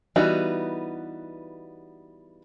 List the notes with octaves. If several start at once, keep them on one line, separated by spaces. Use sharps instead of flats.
E3 G3 B3 D#4 F#4